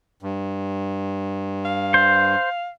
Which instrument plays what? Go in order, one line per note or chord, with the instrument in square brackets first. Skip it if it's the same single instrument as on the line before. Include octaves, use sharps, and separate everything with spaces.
[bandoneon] G2
[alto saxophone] F5
[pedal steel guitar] C5